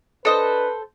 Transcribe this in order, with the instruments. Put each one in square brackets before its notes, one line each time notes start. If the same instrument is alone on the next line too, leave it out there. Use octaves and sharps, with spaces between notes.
[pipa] D4 D#5 [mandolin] A4 C5 [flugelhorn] B4